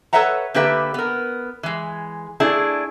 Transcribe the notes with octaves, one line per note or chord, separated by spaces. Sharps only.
A4 B4 C#5 E5 F#5 A#5
D3 A#3 G4 B4 E5
B3 A#4
E3 G#3
A3 D4 E4 G#4